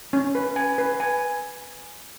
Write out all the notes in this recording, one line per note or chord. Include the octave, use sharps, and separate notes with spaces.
C#4
B4
G#5
B4
G#5